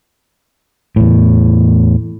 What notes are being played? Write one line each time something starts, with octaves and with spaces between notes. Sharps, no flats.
E2 A2